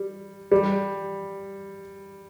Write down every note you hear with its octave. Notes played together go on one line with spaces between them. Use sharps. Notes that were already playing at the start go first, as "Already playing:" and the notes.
Already playing: G3
G3